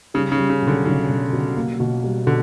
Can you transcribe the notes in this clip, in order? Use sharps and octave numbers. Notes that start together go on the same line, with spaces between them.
C#3 G3
C#3
G3
C#3
B1
D3
B1 C#3
B1
B2
A#3
B2
G3
B2 D3